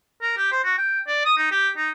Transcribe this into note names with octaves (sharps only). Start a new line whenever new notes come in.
A#4
G4
C5
F#4
G5
D5
D#6
D#4
G4
D#4